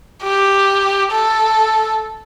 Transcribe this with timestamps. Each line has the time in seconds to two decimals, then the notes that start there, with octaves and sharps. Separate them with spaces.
0.23 G4
1.12 A4